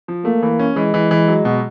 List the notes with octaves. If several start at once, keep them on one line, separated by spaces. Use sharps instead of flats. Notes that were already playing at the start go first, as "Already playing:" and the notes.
F3
A3 A#3
E3
C#4
E3 G#3
E3
E3
F#3
B2